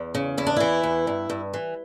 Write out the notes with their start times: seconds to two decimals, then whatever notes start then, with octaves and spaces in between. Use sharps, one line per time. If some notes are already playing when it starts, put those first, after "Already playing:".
Already playing: E2
0.15 C#3
0.38 E2 E4
0.47 D4
0.56 E3 E4
0.83 E2
1.07 G2
1.30 G2
1.54 E3